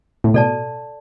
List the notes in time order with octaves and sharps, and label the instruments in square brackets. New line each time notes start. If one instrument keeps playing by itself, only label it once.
[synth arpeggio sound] A2
[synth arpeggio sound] B2 [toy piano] A4 D5 A5